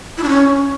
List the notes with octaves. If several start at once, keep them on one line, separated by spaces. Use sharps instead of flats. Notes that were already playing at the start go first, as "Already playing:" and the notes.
E4
D4
C#4